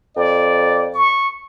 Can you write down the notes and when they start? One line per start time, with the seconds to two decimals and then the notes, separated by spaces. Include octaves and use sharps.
0.17 F2 D5
0.94 C#6